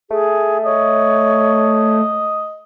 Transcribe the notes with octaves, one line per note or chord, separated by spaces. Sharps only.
A3 G#4
C#5 D#5